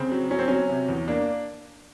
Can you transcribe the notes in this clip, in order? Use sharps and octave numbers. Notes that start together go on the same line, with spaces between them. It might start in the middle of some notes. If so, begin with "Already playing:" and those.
Already playing: C#3 C4
F#3
F#3 C#4
C4
F#3 C#4
C3
E2
A#3 D4